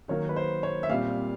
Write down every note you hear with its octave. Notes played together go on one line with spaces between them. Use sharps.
D#3 F#3 A#3 C#5
B4
C5
C#5
E5
A#2 G3 C4 F5